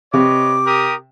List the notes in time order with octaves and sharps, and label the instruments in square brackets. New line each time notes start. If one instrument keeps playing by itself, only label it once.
[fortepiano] C3 [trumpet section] B4 C#5 D#5 [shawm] D6
[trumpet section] G4 A#4 D#6